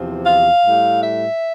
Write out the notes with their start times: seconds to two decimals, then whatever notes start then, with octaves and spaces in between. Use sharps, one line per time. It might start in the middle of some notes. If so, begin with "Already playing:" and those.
Already playing: E2 C3 F3
0.26 F5
0.65 A2 G3
1.03 E5